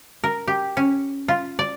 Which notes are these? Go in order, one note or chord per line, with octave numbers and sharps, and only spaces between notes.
A#4
G4
C#4
F4
D5